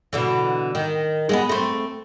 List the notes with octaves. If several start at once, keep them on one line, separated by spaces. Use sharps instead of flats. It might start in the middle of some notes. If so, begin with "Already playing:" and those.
B2 D3 E3
D#3
G#3 A#3 B3
A3 C4